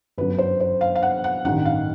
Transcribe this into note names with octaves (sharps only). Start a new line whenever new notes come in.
G1 F#2 D3 F#3 B4
C5
C5
F5
F5
F#5
F#5
A1 G2 D#3 F#5
F5